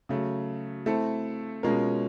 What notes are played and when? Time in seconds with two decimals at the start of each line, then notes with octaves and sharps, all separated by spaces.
0.09 C#3 F#3 A3
0.86 A3 C4 E4 A4
1.63 B2 G#3 C#4 F4 A#4